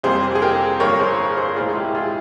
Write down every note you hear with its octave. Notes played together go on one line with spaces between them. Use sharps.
F2 C3 G3 A#3 G#4 C5
G#4
G4 A#4
G1 G2 F3 A#3 A#4 C#5
G#4 C5
G#4 C5
C2 A#2 G#3 F4 G#4
E4 G4
F4 G#4